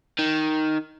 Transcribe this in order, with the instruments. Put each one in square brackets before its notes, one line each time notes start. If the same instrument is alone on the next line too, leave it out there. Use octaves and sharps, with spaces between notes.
[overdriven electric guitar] D#3